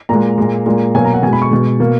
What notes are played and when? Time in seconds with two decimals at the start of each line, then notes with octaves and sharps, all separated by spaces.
0.09 A#2 G#3 A#5
0.38 A#2 G#3
0.66 A#2 G#3
0.95 B2 F#3 A#3 G#5
1.05 A#5
1.14 F#5
1.23 B2 G#3 G#5
1.33 B5
1.42 C#6
1.51 B2 G#3
1.80 B2 A#3